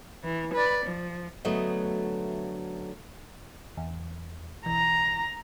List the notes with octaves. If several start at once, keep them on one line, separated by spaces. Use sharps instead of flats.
E3
B4 D5
F3
D2 F#3 A3 B3 D#5
E2
B1 E3 A#5